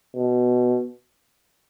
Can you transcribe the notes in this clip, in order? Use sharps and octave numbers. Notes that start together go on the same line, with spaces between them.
B2